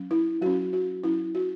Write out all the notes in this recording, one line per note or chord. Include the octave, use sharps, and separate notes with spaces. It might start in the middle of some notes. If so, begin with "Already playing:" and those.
Already playing: F#3 C#4
E4
F#3 C#4 F#4
F#4
F#3 C#4 E4
F#4